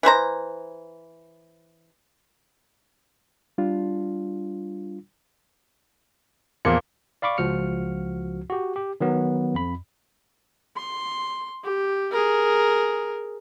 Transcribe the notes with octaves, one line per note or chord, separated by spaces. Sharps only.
E3 A3 C5 A#5
G3 D4 F4
E2 A#2 F3 A#3 A#4 C#7
D5 F5 B5 C#6 D6
C#2 F3 F#4 F6 C#7
F#4 G4
G4
D#3 F#3 B3
F2 B5
C6
G4
G#4 A#4